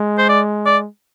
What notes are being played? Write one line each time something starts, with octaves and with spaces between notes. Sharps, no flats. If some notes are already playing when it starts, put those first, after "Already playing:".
Already playing: G#3
C5
D5
D5